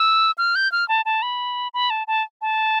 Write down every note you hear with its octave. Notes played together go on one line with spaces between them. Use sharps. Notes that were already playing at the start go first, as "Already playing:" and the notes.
Already playing: E6
F6
G6
F6
A5
A5
B5
B5
A5
A5
A5